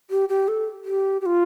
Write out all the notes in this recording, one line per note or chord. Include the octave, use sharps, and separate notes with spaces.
G4
G4
A4
G4
G4
F4